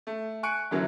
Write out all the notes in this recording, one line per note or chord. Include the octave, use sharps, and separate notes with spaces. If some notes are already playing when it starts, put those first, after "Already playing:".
A3
G#5 C#6 F#6 C#7 D7
F#2 D3 E3 F#3